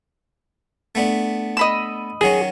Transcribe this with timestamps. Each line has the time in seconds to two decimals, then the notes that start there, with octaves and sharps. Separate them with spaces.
0.95 A3 B3 D4
1.57 D#5 B5 E6
2.21 D#3 F#3 C#4 G#4